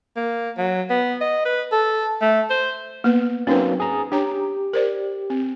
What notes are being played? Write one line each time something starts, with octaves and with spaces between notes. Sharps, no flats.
A#3
F#3
B3
D#5
B4
A4
A3
C5
A#3 B3 B4
F#3 A#3 C4 C#4 D#4 B4
G#4 A#5
D4 G4 C#5 A#5
A#4 C5 D5
C4